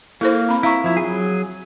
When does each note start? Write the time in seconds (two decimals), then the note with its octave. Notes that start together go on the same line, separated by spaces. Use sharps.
0.21 A#3 E4 A4 C5
0.49 C4 B5
0.63 E4 F5 A#5 C#6
0.84 F3 E4
0.97 F#3 G#4